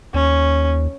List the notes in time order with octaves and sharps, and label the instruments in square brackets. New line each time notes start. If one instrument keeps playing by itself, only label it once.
[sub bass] D#2 [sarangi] C#4